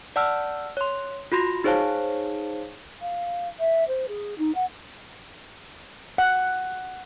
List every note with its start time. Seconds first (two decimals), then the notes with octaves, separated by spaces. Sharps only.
0.16 D5 F#5 A5 E6 F6
0.77 C#5 C6
1.32 F4 F#4 B5 C6 A#6
1.64 D#4 G#4 C5 C#5 F5 A5
3.01 F5
3.59 E5
3.88 C5
4.08 G#4
4.38 D#4
4.54 F#5
6.18 F#5